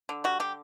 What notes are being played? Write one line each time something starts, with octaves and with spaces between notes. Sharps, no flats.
D3
G3 F#4
D3 G4